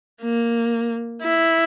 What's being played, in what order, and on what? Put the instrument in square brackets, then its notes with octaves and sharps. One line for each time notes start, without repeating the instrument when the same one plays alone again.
[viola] A#3
E4